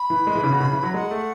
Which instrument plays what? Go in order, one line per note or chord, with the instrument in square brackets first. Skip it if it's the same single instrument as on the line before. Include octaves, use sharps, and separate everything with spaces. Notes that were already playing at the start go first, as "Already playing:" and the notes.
Already playing: [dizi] B5
[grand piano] E3
G#3
E3
C#3
B2
C#3
E3
F#3
[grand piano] G#3 [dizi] F#5
[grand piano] A3